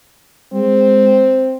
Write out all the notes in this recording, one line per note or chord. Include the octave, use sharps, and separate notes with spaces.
G#3 C4